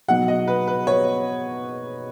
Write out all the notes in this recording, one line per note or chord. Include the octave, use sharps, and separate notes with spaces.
B2 F#3 D#4 F#5
D#5
B4
B4
C#5